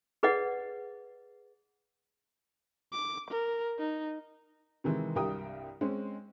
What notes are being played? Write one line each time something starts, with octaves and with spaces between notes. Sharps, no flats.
G#4 B4 D5 D#5 F#5
D6
A#4
D#4
C3 D#3 E3 G#3
C2 G2 G4 A#4 G5 D#6
G#3 C4 C#4